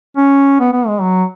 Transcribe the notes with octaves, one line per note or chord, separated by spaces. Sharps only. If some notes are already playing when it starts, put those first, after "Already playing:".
C#4
B3
B3
G#3
F#3